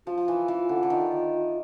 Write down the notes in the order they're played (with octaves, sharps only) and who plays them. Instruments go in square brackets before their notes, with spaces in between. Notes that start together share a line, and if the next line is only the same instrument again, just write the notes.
[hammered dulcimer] F3 [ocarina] F4 F#4
[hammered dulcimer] F3
E3
E3
D3
D3
D#3